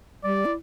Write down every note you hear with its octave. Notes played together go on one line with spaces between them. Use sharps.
G3 D5
E4